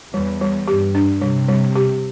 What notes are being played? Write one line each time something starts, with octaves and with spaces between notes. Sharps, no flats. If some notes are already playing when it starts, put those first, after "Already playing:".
E2 G3
G3
G2 G4
D4
C3 G3
G3
G4